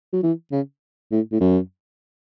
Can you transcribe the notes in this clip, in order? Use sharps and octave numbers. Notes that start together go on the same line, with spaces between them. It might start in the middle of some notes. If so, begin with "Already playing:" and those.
F#3
E3
C#3
A2
A2
F#2